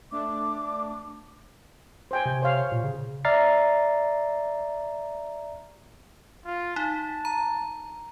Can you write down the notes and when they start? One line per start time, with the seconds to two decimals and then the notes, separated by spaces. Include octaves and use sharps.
0.11 A3 D4 D6
2.11 C5 G5 G#5
2.25 C3
2.42 C5 C#5 F5
2.72 A#2
2.84 C#3
3.25 D5 E5 A#5 F6 A6 C7
6.46 F4
6.76 D#4 A5
7.25 A#5